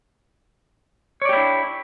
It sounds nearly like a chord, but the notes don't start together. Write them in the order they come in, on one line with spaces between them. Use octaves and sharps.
C#5 D5 G4 E4 D4